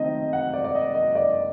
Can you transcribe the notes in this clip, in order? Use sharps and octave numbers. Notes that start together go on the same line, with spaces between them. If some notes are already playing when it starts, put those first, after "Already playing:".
Already playing: D#3 A3 C4 D#4 D#5
F#5
D5
D5
D#5
D#5
D5